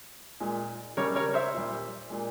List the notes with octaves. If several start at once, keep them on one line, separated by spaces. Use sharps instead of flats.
A#2 G#3
C#3 G3 A#4 C#5
A#4 C#5
C5 E5
A#2 G3
A#2 G#3